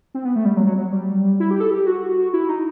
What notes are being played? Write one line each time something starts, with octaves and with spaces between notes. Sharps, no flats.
C4
B3
A3
G3
F#3
F#3
F#3
G3
E4
G4
A4
G4
F#4
E4
D#4